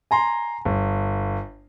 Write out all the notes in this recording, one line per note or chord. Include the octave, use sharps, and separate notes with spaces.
G#5 A#5 C6
G1